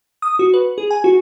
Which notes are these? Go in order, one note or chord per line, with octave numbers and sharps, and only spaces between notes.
D#6
F#4
B4
G#4
G#5
F#4